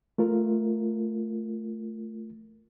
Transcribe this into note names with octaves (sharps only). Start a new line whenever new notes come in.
A3 F4 A#4